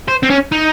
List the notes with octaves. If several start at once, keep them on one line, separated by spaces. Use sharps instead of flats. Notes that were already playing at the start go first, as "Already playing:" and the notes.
C5
C4
C#4
D#4